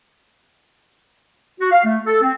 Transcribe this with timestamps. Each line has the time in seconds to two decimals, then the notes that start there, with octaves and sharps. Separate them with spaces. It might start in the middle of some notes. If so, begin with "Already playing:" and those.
1.60 F#4
1.72 F5
1.85 A3
2.06 A4
2.23 C4